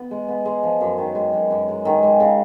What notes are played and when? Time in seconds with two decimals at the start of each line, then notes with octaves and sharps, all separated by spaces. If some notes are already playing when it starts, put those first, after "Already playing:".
Already playing: B3
0.11 G#3
0.28 B3
0.45 G#3
0.63 F3
0.81 F#2
0.98 D#3
1.15 G#3
1.33 F#2
1.51 F#2
1.68 G#3
1.85 D#3
2.03 G#3
2.20 C#3